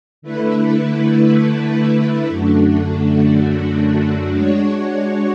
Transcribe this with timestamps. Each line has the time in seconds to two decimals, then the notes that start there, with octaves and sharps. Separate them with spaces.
0.22 D3 A3 E4 B4
2.29 F#2 D3 A3 D4 F#4
4.34 G#3 D4 F#4 C#5